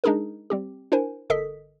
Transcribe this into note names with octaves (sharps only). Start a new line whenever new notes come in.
G#3 D4 D#4 G#4 A#4
G3 C4 G4
D4 E4 A#4 C5 G#5
G1 A4 A#4 D#5 D#6 B6